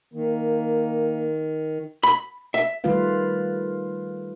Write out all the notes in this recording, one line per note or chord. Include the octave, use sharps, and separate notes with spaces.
D#3 A#3
B5
E5
D#3 G3 A3 F4 B4 F5